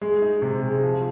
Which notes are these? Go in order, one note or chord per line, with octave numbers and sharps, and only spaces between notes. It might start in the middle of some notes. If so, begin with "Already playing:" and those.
G#3
D#4
C3
G#3
F3